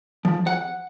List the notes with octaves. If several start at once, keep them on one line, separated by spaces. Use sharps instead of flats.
F3
F#5